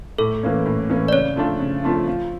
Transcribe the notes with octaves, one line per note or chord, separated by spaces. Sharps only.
A2 A4
E3 A#3 C#4
A2
E3 A#3 C#4
D5
C#3 C#5
F3 A3 D4 F4
C#3
F3 A3 D4 F4
F3